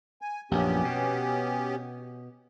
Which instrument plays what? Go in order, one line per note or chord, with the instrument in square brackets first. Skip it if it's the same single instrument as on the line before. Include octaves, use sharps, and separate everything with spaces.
[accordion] G#5
[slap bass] A#1 F#2 [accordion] B3 C#4 G4
[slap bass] B2